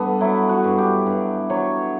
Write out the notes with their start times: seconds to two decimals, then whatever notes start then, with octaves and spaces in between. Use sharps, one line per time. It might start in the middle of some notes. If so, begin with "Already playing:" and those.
Already playing: G2 B3 A4
0.21 F#3 E4
0.49 F#4
0.64 G2
0.78 G4
1.06 G2
1.50 F#3 C#5